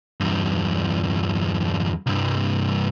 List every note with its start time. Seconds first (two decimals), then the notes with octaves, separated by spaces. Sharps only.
0.20 E2 G2
2.06 C2 G2